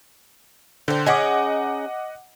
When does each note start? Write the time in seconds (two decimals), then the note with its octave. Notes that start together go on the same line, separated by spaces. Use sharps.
0.88 D3 C5 G5
1.06 C#4 D#4 G#4 D#5 F#5 D6